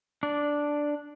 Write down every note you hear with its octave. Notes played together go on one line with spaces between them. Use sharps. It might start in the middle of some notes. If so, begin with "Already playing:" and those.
D4 D5